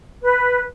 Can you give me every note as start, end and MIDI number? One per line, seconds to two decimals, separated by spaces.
0.23 0.62 71